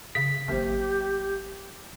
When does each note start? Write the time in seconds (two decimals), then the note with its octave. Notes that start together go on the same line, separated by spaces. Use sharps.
0.15 C#3 B6
0.48 G#1 F#3 A#3 G4 C5